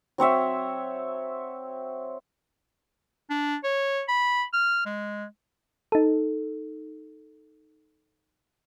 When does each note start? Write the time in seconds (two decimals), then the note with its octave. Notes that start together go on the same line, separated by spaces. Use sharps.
0.18 F#3 C4 C#5 E5
3.30 D4
3.64 C#5
4.08 B5
4.53 F6
4.86 G#3
5.92 D#4 A4